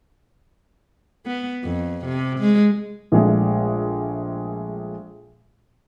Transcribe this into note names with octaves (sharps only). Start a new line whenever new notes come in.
B3
F2
C3
G#3
A#1 A#2 G#3 A3